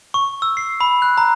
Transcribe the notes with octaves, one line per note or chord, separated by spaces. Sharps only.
C#6
E6
C7
B5
F#6
A#5